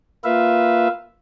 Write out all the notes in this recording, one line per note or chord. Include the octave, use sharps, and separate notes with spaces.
A#3 F4 B4 E5 F5